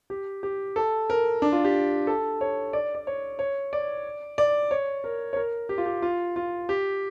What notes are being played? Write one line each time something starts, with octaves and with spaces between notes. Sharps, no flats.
G4
G4
A4
A#4
D4
F4
G4
A4
C#5
D5
D5
C#5
C#5
D5
D5
C#5
A#4
C#5
A#4
G4
F4
G4
F4
F4
G4